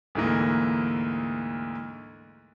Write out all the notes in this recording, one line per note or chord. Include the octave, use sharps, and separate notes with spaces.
D2 G#2 E3 A#3